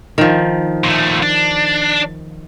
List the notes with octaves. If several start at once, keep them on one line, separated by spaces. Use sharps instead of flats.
D#3 F3
A#2 A3
D4